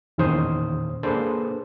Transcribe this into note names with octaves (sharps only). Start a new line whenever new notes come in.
E2 A#2 D#3 C#4 C5 D#6
A#3 D4 G#4 A4 B4 C5